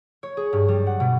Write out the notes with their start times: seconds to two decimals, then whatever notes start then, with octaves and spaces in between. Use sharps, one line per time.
0.23 C#5
0.37 G#4
0.53 G2
0.68 G3
0.87 F#5
1.00 B2